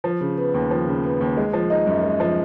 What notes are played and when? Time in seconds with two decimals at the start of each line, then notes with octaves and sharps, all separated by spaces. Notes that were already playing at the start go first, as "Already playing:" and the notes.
0.04 F3
0.21 C#3
0.37 B3
0.54 D#2
0.71 F3
0.87 C#3
1.04 B3
1.21 D#2
1.37 G#3
1.53 F3
1.70 D#4
1.87 F#2
2.03 G#3
2.20 F3